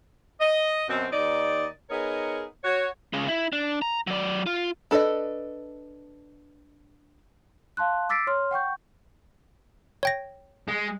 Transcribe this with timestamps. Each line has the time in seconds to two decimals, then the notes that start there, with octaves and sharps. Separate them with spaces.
0.40 D#5
0.89 F#2 B2 C4
1.13 D#2 D#4 D5
1.90 B3 D#4 G#4 A#4 C#5
2.64 F#4 C#5
3.13 C#3 G#3
3.27 E4
3.53 D4
3.82 A#5
4.07 F#3 D5
4.47 F4
4.91 D4 A4 B4 D5 D#5
7.77 F5 A5 C6 F#6
8.09 D6 E6 A6 B6 C7 D7
8.27 C#5 C6 F6
8.51 F#5 G5 C#6 G6
10.03 C#5 G5 A#6
10.68 G#3